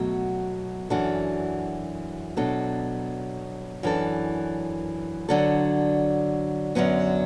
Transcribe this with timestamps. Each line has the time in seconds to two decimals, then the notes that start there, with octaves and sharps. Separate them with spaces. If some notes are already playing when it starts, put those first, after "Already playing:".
Already playing: B2 F#3 A3 F#4
0.90 F#2 E3 D4 F#4 A4
2.37 B2 F#3 D4 A4
3.83 F#2 E3 D4 A4
5.29 D3 F#3 D4 A4
6.75 F#2 D3 F#3 B3